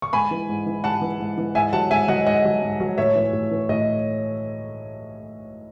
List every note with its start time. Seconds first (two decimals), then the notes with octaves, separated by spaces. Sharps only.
0.02 C#6
0.13 G#2 G#5 B5
0.31 E3
0.49 G#2
0.66 E3
0.84 G#2 F#5 A5
1.01 E3
1.19 G#2
1.38 E3
1.55 G#2 E5 G#5
1.73 F#3 F#5 A5
1.91 G#2 E5 G#5
2.08 F#3 D#5 F#5
2.26 G#2 D#5 F#5
2.44 F#3
2.62 G#2
2.80 F#3
2.98 A2 C#5 E5
3.15 E3
3.33 A2
3.51 E3
3.69 A2 D#5